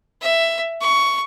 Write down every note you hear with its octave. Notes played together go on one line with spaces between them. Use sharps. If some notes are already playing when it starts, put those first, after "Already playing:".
E5
C#6